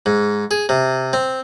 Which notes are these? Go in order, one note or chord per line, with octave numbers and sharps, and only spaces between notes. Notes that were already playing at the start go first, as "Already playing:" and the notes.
G#2
G#4
C3
C4